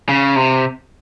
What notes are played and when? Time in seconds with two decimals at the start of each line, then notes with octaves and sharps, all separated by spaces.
0.09 C#3
0.36 C3